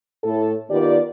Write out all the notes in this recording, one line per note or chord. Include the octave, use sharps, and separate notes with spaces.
A2 A4
D#3 B3 F4 G4 D5